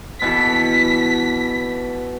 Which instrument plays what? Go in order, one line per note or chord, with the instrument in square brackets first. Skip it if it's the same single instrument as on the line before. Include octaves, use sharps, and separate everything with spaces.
[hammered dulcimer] B2 E3 A4 [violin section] B6